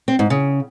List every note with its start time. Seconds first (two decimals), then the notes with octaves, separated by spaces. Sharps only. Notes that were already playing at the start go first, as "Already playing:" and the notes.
0.08 C4
0.19 G#2
0.30 C#3